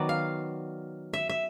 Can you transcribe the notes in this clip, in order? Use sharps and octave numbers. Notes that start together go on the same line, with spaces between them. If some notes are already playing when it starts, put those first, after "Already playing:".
Already playing: D#3 F#3 B3 D5
F5
E5
E5